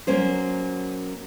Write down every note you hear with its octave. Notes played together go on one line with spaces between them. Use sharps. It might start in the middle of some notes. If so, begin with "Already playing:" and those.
F#3 A#3 C#4 C5